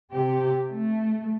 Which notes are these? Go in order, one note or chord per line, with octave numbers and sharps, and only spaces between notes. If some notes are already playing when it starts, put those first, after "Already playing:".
C3 G4
A3